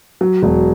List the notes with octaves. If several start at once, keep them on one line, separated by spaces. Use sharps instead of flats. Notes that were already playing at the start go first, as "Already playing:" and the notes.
F#3
E1